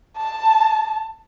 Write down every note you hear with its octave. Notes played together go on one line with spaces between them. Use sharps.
A5